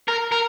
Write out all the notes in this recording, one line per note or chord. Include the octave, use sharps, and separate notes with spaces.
A#4
A#4